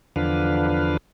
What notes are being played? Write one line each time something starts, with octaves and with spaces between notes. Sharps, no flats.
E2 D3 F3 D4 B4 F5